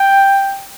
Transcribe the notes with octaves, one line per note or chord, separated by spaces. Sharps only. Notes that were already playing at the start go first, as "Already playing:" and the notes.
Already playing: G5